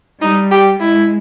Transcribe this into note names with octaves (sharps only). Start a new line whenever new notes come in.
G3 D#4
G4
G#3 E4